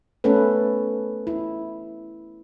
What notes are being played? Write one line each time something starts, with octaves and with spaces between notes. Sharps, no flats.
A3 B3 C#4 A4 B4
E4